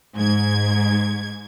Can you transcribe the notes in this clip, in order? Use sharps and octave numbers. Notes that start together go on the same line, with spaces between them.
G#2 G#6